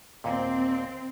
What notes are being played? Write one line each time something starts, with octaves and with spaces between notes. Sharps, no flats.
D#2 A#2 C4